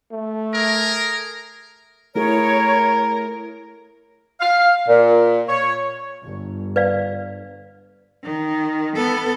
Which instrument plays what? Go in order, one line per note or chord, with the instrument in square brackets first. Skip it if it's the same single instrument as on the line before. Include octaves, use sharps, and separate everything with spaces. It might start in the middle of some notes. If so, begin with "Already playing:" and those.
[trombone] A3
[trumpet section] G#4 A#4
[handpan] A3 E4 G#4 [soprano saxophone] A#4 [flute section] C#5
[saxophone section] F5
A#2
C#5
[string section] G1
[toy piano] B4 D5 F5
[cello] D#3
B3 A4